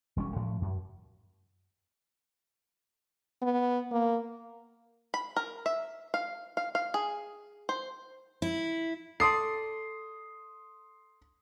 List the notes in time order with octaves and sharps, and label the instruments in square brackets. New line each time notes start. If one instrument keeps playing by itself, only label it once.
[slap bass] E1 G3 C#4
A2 F3 A3
F#2
[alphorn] B3
A#3
[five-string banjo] B5
A#4
E5
F5
F5
F5
G#4
C5
[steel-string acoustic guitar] E4
[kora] A4 D5 [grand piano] C6 D#6 C7